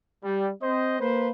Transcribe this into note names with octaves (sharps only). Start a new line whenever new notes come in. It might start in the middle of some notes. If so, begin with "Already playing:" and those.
G3
C4 C5 D#5
A#3 B4 C5